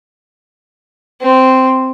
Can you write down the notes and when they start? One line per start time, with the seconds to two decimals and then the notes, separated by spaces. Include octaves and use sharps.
1.21 C4